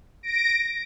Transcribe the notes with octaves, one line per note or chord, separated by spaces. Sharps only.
A#6 D7